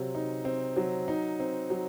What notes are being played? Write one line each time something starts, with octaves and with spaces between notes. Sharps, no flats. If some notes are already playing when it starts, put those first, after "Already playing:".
Already playing: C3 F#3 C4
D#4
C4
F#3
D#4
C4
F#3